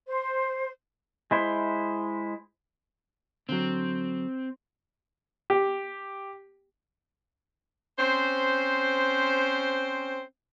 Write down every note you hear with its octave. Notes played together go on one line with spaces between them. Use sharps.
C5
G#3 E4 C5
D3 F#3 C4
G4
C4 C#4 C5